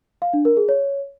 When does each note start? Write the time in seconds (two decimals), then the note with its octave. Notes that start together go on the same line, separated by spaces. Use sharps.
0.22 F5
0.33 D4
0.45 A#4
0.57 G#4
0.69 C#5